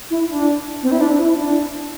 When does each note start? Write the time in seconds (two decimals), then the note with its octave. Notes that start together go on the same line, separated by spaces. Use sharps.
0.10 E4
0.29 D4
0.83 C4
0.91 E4
1.01 D4
1.19 E4
1.37 D4